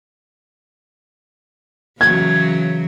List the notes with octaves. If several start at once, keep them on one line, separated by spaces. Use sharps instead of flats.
C#3 E3 F#3 G#6